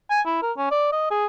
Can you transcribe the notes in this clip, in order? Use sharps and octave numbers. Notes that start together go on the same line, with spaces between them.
G#5
E4
A#4
C#4
D5
D#5
G#4